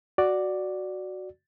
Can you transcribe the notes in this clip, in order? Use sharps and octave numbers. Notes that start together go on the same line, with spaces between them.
F#4 D5